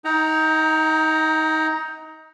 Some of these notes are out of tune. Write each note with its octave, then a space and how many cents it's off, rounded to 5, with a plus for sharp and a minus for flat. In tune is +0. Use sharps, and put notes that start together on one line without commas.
D#4 +25 F#5 +45 A#5 +0